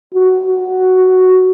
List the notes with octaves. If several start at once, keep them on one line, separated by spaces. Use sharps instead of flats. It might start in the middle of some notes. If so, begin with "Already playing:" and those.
F#4